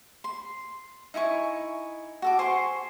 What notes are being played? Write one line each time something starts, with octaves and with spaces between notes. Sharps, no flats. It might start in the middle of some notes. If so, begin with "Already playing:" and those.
C6
D#4 E4 G#5 C#6
F#4 A4 D6
C5 G#5 C6 C#6